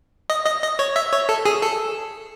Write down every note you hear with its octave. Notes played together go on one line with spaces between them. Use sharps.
D#5
D#5
D#5
C#5
E5
C#5
A4
G#4
A4